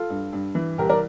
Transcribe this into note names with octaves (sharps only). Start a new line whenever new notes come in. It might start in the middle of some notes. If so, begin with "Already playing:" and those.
Already playing: F4 A4
G2
G2
E3
C2 G4 A#4
A#4 D5